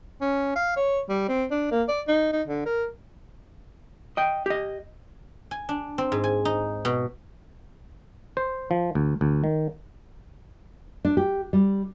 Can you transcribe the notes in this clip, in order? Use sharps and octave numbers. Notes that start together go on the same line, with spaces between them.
C#4
F5
C#5
G3
C4
D4
A#3
D5
D#4
D#4
D3
A#4
D#5 G5
G4 D#5
G#5
D4
C4
G#2
G#5
D#4
B2
C5
F3
D2
D2
D#3
D4
G4
G3